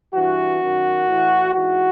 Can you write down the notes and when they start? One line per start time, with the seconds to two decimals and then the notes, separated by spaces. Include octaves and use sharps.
0.12 G2 E3 F#4
0.60 F#2 D#3
1.06 A2 E3
1.53 G#2 E3 F#4